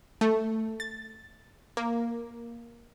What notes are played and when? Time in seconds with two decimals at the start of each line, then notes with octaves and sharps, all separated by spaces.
0.21 A3
0.80 A6
1.77 A#3